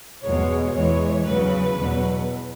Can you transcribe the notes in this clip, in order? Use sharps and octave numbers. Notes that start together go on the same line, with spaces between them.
E2 B2 G#3 C#5
E2 E3 G#3 C#5
E2 C#3 F#3 B4
E2 B2 F#3